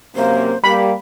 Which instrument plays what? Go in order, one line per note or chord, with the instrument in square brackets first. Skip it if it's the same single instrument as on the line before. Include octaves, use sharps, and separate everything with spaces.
[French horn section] F#2 C3 A#3 [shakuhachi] C5
[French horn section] G3 A#3 [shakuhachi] G4 [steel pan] B5